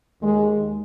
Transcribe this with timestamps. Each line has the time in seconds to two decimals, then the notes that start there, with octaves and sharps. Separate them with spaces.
0.22 D#2 D#3 G#3